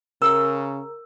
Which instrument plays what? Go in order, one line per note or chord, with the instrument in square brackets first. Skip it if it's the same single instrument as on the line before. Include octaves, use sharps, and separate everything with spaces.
[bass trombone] C#3 [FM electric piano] A#4 [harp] E6